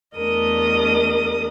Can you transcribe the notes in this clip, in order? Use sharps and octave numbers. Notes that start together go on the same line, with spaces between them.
E2 A3 D4 A#4 D#5 D#6